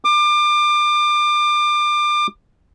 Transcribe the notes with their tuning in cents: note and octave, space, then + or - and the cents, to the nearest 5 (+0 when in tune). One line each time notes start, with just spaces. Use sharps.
D6 +30